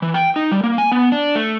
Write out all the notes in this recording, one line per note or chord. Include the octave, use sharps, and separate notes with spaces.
E3
G5
D#4
G3
A#3
G#5
B3
D4
A3